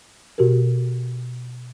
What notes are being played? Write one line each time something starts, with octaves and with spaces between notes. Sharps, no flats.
B2 F#4 G4 A#4